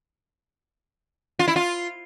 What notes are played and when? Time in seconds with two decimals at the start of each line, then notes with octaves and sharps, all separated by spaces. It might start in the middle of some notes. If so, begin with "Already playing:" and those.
1.39 F4
1.48 E4
1.56 F4